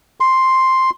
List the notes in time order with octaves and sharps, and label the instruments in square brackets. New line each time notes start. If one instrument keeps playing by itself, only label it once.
[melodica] C6